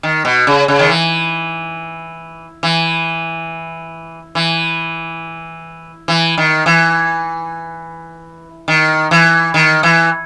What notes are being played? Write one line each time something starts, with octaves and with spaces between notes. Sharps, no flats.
D#3
B2
C#3
C#3
D#3
E3
E3
E3
E3
D#3
E3
D#3
E3
D#3
E3